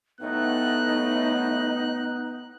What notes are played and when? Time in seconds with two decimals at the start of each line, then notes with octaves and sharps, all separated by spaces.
0.21 A2 F#3 A3 B3 D#4 F#6